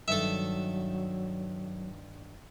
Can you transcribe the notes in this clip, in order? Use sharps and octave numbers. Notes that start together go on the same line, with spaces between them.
G2 D#3 F#3 A4 E5